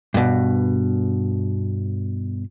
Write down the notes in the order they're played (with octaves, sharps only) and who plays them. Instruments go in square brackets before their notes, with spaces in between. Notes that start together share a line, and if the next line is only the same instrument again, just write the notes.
[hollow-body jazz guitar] G2 B2